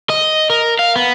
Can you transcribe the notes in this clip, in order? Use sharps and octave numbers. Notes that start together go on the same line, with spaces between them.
D#5
A#4
F5
B3